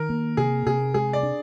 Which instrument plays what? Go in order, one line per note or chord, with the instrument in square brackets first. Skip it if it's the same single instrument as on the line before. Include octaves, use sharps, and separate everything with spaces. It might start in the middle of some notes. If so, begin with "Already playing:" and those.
Already playing: [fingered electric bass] D#3 [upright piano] A#4
[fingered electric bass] A#3
[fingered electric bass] C3 [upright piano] G#4
[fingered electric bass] C3 [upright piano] G#4
[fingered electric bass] G#3 [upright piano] G#4
[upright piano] D5
[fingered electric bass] D4